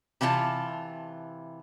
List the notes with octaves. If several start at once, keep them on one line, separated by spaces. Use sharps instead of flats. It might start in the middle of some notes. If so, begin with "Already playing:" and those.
C3 E3 F4 G#4 A5